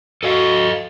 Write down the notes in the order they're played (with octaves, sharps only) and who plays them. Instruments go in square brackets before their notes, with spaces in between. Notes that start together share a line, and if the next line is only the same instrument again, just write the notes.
[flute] F#4 [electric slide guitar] A4 D#5 F5